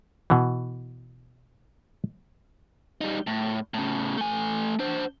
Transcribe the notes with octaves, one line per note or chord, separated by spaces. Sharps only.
B2 E3
G3 D#4
A2
A2 C#3
A3 G#5
D4 C5